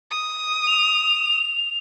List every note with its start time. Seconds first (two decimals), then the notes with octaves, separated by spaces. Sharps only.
0.11 D#6
0.67 F7